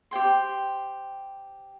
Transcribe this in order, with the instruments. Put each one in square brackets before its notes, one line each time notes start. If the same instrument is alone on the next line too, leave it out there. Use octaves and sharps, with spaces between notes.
[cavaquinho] G4 C5 G5 C6